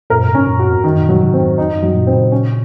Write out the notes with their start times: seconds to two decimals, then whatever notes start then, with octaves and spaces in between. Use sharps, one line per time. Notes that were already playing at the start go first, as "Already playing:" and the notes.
0.10 F#2 A#2 A#4
0.29 G#2 C3
0.35 C#4
0.47 F#2 A#2
0.59 F#4
0.66 F2 G#2
0.84 F#2 D#3
1.02 F#2 A#2
1.09 F#3
1.17 C#3
1.21 G#2 C3
1.34 C4
1.39 F2 G#2
1.58 F2 D#4
1.77 F#2
1.82 F#3
1.94 F#2 A#2
2.07 C4
2.13 A#2 C#3
2.32 C#4